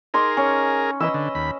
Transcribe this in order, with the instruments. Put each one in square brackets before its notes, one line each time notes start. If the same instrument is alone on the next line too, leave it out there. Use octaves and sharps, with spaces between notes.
[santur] D#4 C6 D6 [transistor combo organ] G#4 A#4
[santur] C#4
[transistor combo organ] E3 [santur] B4 D#5 E6
[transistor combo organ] D3
D#2 B5